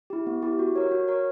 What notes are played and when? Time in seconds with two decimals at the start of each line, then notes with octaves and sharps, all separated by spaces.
0.10 E4 G4
0.27 B3
0.42 E4 G4
0.59 F#4
0.76 A#4 C#5
0.91 F#4
1.08 A#4 C#5